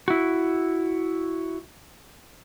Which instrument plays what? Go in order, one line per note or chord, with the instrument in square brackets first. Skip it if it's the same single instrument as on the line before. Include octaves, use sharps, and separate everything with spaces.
[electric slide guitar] E4 F#4